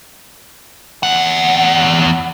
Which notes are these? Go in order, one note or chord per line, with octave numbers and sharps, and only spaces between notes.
E2 F#5